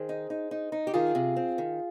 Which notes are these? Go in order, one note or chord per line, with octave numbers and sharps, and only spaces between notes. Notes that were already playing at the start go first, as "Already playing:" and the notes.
Already playing: D#3 G#4 C5
D#4
D#4
D#4
D#4
G4
D#3 F4 G#4
C3
C4
D#3